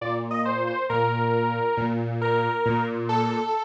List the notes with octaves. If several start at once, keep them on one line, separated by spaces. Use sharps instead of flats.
A#2 D5
D#5
C5
C5
A#2 A#4
A#2
A#4
A#2
A4